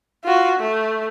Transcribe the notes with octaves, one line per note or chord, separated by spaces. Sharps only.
F4 F#4
A3